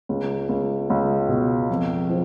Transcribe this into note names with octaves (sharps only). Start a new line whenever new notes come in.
C#2
C#2
C#2
B2
F2
F3